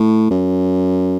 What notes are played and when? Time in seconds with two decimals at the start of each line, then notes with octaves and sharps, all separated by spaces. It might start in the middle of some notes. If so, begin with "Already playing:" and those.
Already playing: A2
0.31 F#2